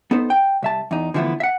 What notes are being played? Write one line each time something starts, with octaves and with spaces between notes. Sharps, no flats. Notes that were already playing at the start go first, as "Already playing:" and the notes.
B3 D#4 A4 C5
G5
C2 E5 A5
E2 D#4
D3 E3 F3 A3 B3 E4
E5 F#5